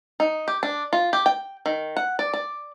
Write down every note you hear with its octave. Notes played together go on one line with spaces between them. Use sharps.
D#4
G4
D4
F4
G4
G5
D#3
F#5
D5
D5